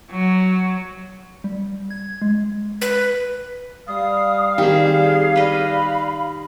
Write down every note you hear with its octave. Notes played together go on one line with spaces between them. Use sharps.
F#3
G3
G#6
G#3
B4
G3 F5 D#6
D#3 C4 G4 G#4
B4 D#5 B5